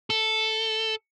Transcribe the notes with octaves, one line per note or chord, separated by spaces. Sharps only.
A4